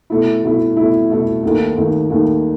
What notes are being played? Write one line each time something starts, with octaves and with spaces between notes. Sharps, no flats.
B2 A3 E4
B2 A3 E4
B2 A3 E4
B2 A3 E4
D#2 D#3 A3
D#2 D#3 A3
D#2 D#3 A3